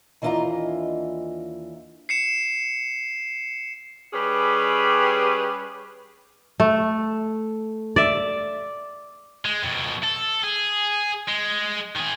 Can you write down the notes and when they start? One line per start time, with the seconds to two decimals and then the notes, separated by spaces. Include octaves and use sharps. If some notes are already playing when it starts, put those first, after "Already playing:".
0.22 D#2 E3 D4 F4 D#5 A#5
2.09 C7 C#7 E7
4.13 G3 C#4 G4 G#4 B4
6.60 A3
7.96 D5 E5
9.45 G#3
9.63 F2 B2
10.03 A4
10.43 G#4
11.28 G#3
11.96 D#3 G#4